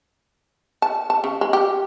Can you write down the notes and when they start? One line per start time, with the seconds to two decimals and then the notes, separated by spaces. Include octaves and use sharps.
0.82 A5
1.10 A5
1.24 C#3
1.41 G#3
1.53 G4